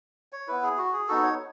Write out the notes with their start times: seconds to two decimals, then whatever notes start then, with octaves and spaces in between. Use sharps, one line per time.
0.32 C#5
0.48 B3 E4 B4
0.63 G#4
0.78 F#4
0.93 G#4
1.08 B3 D#4 F#4 A4
1.23 C#5